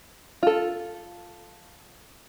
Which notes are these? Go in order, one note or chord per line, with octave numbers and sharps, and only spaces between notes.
F4 A4